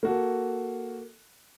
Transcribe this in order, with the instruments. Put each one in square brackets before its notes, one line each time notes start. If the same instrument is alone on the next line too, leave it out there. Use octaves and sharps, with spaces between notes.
[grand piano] A#3 F#4 A4